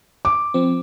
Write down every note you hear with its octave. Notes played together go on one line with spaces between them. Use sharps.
D6
F3 C4